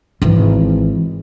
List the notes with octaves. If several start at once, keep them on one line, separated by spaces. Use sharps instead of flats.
G#1 E3